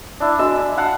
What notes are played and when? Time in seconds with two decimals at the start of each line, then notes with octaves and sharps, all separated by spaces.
0.20 D4 E4
0.39 D4 F#4 D#5 E6
0.77 F5 F#5 A5